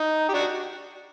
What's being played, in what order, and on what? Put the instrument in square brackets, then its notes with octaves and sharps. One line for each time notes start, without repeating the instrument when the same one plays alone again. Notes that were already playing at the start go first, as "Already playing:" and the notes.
Already playing: [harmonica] D#4
G4
D4 F#4